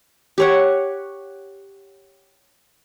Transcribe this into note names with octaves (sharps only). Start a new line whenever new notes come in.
G4 C#5 F#5